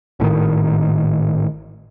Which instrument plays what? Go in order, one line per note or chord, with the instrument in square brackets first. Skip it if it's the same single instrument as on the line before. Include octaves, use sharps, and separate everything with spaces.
[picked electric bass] G#1 A2 D3 D#3